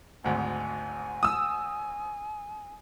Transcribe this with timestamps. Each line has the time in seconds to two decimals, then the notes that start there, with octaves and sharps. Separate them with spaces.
0.24 G#1 D2 G#2 G#5
1.23 D#6 E6